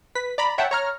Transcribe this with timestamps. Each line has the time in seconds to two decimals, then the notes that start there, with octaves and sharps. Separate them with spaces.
0.15 B4 B6
0.38 D5 A#5 B5
0.58 C#5 E5 F#5 G5 A5
0.71 C#5 A#5 F6